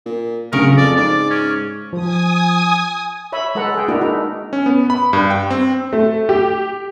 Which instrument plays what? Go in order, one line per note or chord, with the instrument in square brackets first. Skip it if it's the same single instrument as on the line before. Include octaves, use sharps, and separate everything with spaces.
[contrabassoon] A#2
[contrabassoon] D1 [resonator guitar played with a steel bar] C#3 [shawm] A#4
[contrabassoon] F2 [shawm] D5
[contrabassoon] G#2 [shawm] D5
[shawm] C#4
[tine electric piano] F3 [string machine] G#5 D#6
[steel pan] C#5 E5 B5
G#3 A4 B4 F#5 A#5
G#4 G5
A#3 D4 E4 F#4 A#4
D#4
[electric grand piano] C#4
B3
B5
G2
G5
C4
[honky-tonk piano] A3
G4